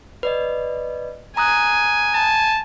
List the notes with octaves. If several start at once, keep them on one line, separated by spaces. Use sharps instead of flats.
B4 D5 D#5
G#5 A#5 D#6 F#6
A5